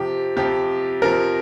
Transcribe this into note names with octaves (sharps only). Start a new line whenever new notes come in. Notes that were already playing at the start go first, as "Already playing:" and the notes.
Already playing: F2 C3 F3 G4
F2 C3 F3 G4
F2 C3 F3 A#4